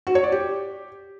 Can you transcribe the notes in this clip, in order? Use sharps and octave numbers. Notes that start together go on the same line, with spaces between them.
F#4
C#5
D5
G4